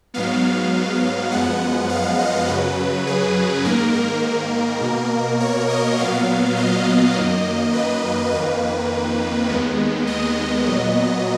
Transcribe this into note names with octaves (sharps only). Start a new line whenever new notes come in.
G#2 F#3 B3 F5
F#2 F3 G#3 B3 F#5
F5
D#5
F#2 C#3 F#3 B4
G#4
G#2 D#3 A#3 A#4
A#4
B2 A#3
C#5
D#5
A#2 F#3 B3 F5
D#5
F#2 D#3 A#3
B4
F2 D#3 A#3 B4
D#2 D#3 G#3 B3
D#5
A#2 F#3 B3